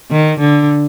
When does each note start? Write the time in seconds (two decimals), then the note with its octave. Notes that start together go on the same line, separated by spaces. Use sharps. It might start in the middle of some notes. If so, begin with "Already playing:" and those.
0.11 D#3
0.40 D3